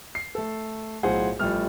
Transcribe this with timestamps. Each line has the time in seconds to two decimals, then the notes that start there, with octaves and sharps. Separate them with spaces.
0.15 C7
0.35 A3 A4
1.03 B1 A2 F4 G#4 C5 F#5
1.39 A1 F3 G3 A3 F6